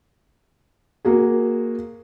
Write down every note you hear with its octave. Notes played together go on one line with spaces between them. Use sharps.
A#3 F#4 G#4